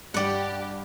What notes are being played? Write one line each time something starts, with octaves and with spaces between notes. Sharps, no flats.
G2 G4 D5 F#5